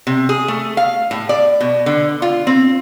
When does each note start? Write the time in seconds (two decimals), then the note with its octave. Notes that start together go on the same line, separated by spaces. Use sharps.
0.07 C3
0.29 G#4
0.48 A3
0.77 F5
1.11 A2
1.29 D5
1.61 B2
1.86 D3
2.22 F4
2.47 C4